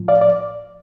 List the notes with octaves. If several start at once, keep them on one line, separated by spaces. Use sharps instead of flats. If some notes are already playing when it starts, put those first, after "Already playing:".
Already playing: A2 F3
D5 F5
D5